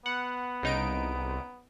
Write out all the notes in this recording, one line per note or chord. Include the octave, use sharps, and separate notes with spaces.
B3 F#5
C2 C#3 D#4 D7